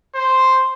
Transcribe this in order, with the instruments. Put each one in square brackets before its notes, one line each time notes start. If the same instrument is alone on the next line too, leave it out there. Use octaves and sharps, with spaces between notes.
[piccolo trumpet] C5